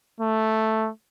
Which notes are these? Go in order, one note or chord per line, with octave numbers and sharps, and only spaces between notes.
A3